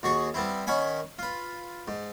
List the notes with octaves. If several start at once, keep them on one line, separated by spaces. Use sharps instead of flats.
D#2 F#4 G#4 C#6
G3 B3 C4 E4
D#3 C#4 F#5 G#5 B5
F4 B4
G#2